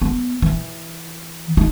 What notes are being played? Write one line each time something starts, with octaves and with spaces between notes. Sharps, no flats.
B3
E3
D#4